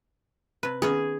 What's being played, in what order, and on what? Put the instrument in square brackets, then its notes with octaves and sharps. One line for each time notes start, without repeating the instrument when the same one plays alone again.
[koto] C3 B4
[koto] D#3 B3 C#4 [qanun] G#4